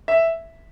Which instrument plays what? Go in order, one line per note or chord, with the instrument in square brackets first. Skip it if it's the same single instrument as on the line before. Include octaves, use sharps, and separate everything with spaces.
[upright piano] E5